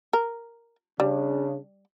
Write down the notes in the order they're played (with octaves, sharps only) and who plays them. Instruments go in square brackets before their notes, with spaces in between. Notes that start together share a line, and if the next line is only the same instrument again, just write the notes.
[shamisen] A#4
[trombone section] C#3 D4 [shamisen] G3